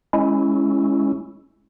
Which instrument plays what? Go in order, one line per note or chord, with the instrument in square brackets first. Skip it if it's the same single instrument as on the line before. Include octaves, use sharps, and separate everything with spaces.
[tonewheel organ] G#3 C#4 E4